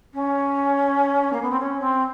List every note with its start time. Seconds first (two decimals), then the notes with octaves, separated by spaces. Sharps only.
0.14 C#4
1.33 A#3
1.42 B3
1.51 C4
1.59 C#4
1.80 C4